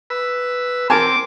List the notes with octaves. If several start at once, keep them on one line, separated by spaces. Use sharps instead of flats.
B4 E6
C4 A#4 G#5 A5 D6